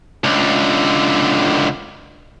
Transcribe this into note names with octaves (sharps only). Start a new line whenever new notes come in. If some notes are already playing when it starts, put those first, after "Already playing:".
C#2 D3